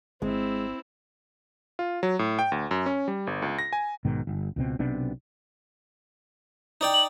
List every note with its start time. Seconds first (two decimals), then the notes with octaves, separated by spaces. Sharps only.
0.22 G#1 G#3 C4 E4
1.79 F4
2.03 F#3
2.19 A2
2.39 G5
2.52 D2
2.71 F#2
2.86 C#4
3.08 G3
3.27 G1
3.42 C#2
3.59 A#6
3.73 G#5
4.05 B1 G#2 B2 D#3
4.27 G1
4.56 C#2 B2 C4
4.79 B1 C3 B3 D4
6.81 D#4 D5 G5
6.94 F#7